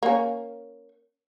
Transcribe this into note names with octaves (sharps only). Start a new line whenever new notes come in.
A#3 C#4